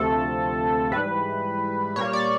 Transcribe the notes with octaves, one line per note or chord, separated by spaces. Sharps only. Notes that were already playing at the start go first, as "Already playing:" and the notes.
Already playing: D2 C3 F3 A3 A4
G#2 E3 G3 B4
A#2 G3 A#3 C#5
D5